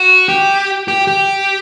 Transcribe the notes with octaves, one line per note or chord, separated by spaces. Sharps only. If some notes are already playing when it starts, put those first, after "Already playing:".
Already playing: F#4
G4
G4
G4